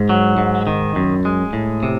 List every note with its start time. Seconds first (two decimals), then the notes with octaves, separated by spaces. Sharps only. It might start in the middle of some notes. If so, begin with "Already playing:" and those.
Already playing: G#2
0.09 F#3
0.38 G#2
0.67 D#3
0.96 F#2
1.25 G#3
1.53 A2
1.83 C3